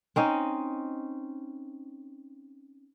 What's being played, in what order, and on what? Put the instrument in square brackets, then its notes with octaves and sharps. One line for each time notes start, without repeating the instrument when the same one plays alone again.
[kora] C4 C#4 D#4